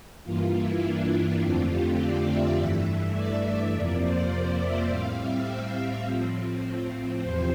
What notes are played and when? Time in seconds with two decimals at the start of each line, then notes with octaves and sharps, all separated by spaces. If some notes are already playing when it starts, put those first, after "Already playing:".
0.24 G2 E3 A#3 F4
0.53 E4
0.83 D4
1.11 E4
1.40 F2 D3 A3 C4 F4
1.69 G4
1.98 D5
2.27 E5
2.56 G2 E3 A3
3.14 D5
3.72 F2 C3 F3 A#3 D5
4.01 C5
4.30 D5
4.58 E5
4.87 A2 G3 C4 F5
5.16 E5
5.46 F5
5.74 E5
6.03 A2 F3 C4
7.19 E2 C3 F3 C4 C5